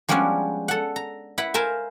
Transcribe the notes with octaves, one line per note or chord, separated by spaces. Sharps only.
F3 G3 G#3 B3 C#4 D4
A4 F#5
A#5
E4 B4 F#5 B5
A#4 C5 E5 F5 G#5